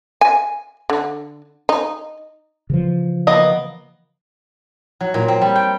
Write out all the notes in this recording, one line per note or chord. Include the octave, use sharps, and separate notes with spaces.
G#5
D3
D#4
C#3 E3 F3
A#3 B3 D#5
F#3
A#2
C4
G3
G5